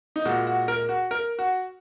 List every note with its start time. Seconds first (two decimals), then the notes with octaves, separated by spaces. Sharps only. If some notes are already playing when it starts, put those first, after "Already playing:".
0.16 D#4
0.25 A#2 G#3 F#4
0.47 F#4
0.68 A#4
0.89 F#4
1.11 A#4
1.39 F#4